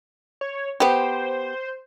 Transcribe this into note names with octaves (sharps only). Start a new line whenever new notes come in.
C#5
B3 G4 C5